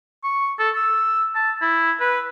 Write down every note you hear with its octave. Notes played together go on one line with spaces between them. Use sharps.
C#6
A4
E6
A5
E4
B4